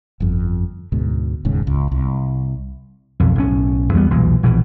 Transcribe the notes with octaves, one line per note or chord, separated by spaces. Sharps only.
G1 F2
D2 G#2 B2
E1 D#2 G#2 C#3
C#2
C2
B1 F2
B1 A2 C#4
E2 G2 G3 B3
B1 E2 A#2
A#1 B2 E3